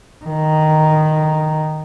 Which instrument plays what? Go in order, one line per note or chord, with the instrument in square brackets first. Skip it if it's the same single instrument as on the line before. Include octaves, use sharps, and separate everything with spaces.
[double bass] D#3